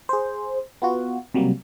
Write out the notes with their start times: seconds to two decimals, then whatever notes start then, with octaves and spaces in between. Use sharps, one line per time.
0.09 G#4 C5
0.82 B3 F4 F#4
1.34 C3 F#3 G3 A#3